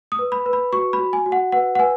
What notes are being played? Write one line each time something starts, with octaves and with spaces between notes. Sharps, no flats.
D#6
B4
B5
B4
B5
F#4 C#6
B5
F#4
G#5
F#4
F#5
B4 F#5
F#5
B4 G#5